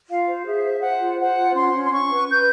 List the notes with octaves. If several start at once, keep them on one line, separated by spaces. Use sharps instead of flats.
F4 F5
C5
G#4 E5
C5
C5 F#5
F4
C5 F#5
F4
C#4 C6
C#4
C6
C#4 C#6
B4
B4 G6